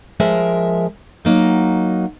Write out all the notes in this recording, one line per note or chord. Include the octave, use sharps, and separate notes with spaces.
F3 G#3 A#4 E5
F#3 A#3 D#4